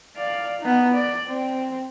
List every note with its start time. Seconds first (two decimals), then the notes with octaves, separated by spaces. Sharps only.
0.17 D5 F5
0.61 B3 D#4
0.92 D5
1.27 C4